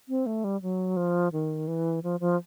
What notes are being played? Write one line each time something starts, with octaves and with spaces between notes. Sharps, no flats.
C4
A3
G3
F#3
F3
D#3
E3
F3
F3